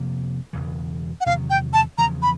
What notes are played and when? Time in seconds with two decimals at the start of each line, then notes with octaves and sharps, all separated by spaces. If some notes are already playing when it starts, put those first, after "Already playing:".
Already playing: F2 C3 F3 A#3
0.53 E1 E2 C#3 E3
1.21 F#5
1.26 E2 C3 D#3 F#3 F5
1.50 G5
1.73 A5
1.98 E2 C#3 F3 A#5
2.22 B5